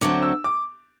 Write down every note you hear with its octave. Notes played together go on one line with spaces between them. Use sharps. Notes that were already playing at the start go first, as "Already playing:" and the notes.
D2 D3 F#3 C4 D6
E6
D6